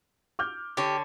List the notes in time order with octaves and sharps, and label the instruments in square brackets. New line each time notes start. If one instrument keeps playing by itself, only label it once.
[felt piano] D6 F6 G6
[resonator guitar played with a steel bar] D3 C#5 [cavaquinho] G4